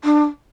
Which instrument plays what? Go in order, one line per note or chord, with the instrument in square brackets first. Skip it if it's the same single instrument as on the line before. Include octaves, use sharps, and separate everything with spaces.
[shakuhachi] D4